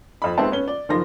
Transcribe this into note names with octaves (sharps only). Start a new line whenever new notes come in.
F2 B5
D#2 G#3 B3 C4 E5 A5
B3 C#4 G7
D5
F#1 D#3 F3 A#3 C6 A#6